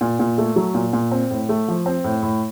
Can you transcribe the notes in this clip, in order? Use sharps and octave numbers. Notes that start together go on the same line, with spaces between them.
A#2
A#2
A3
F#3
A#2
A#2
C4
A2
A3
F3
C4
A2
A2